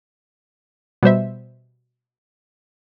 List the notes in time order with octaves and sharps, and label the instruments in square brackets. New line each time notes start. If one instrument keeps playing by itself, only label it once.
[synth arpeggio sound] B2 G3 C5 E5